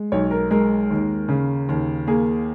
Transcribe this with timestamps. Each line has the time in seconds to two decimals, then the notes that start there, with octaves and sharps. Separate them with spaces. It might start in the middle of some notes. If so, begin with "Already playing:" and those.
Already playing: G#3
0.12 B1 C#5
0.31 A#4
0.51 G#3 A#4
0.90 D#2
1.29 C#3
1.69 D#2
2.07 A#3 G#4